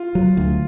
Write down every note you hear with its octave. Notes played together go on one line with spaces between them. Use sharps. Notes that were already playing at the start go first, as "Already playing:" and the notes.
Already playing: F4
F#3
D2